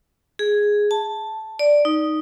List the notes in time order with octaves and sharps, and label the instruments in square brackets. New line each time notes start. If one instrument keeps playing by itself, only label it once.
[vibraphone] G#4
A5
D5
D#4